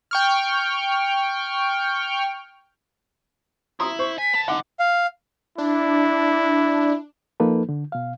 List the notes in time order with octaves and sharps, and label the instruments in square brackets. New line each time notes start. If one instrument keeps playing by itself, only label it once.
[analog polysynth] G5 C#6 F6
[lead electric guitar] E4 [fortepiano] A#5 C6 D#6
[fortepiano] C5 [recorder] C#6
[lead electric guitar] G#5 [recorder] B6
[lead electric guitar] B3 A5
[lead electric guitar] G2 D3 [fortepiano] D#4 F#5 [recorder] D6
[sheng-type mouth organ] F5
[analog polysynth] D4 [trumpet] E4
[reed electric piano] F3 A#3 D#4 A4 B4
D3
B2 F5